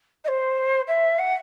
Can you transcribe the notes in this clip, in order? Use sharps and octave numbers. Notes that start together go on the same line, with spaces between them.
D#5
C5
E5
F#5